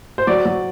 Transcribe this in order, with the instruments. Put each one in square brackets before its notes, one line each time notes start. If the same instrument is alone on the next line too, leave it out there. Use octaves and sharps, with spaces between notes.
[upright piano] C5
F#3 D5
F#3